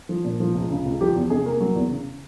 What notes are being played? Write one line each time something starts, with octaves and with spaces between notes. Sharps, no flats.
F3
A#2
F3
C#2
C#3
C#2
F3 G4
E2
C3 G#4
A#3
F#3
E2
C#3